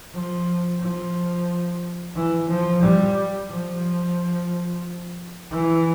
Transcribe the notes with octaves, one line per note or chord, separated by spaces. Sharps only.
F3
F3
E3
F3
G3
F3
E3